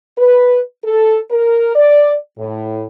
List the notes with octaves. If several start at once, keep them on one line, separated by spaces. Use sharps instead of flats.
B4
A4
A#4
D5
A2